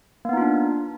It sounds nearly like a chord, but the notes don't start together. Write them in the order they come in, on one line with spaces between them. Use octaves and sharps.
A#3 B3 D#4 F4 D4